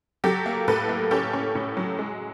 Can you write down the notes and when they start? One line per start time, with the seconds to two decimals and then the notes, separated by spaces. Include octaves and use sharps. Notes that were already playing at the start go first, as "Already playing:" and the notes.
0.24 F#3 G4 A4
0.46 A#3
0.68 A2 A4 B4
0.89 A#3
1.11 C#4 G4 A4
1.33 C#4
1.55 A2
1.77 F#3
1.99 G#3